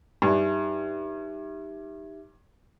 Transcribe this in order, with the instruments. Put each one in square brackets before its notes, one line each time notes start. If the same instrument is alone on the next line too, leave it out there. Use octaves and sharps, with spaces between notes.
[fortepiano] G2 [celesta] D#4 G4 E5